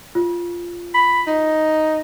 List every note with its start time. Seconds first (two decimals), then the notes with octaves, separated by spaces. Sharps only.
0.15 F4
0.94 B5
1.27 D#4